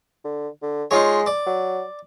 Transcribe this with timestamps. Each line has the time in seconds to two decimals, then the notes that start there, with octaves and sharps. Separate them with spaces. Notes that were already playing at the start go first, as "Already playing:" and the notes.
0.25 D3
0.62 D3
0.91 G#3 D#4 F4 C#5
1.26 D5
1.46 F#3